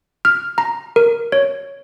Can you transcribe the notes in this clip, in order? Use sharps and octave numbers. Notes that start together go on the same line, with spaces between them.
F6
A#5
A#4
C#5